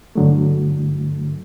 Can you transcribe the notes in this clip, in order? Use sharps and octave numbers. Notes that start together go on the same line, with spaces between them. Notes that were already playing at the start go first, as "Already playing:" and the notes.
G2 D3 F#3 A3